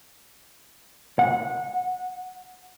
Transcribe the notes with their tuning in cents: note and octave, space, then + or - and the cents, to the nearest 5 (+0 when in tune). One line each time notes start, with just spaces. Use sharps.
F#5 -20